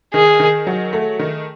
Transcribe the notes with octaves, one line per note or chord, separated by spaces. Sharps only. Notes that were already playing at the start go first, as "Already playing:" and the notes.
D#3 G#4
D#3
F#3
A3
D#3